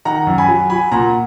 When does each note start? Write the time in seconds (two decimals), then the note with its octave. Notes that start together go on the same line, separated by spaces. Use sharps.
0.05 D#3 F#5 A#5
0.27 F#2
0.38 G#5 B5
0.49 F#3
0.70 F#3 G#5 B5
0.92 A#2 F#5 A#5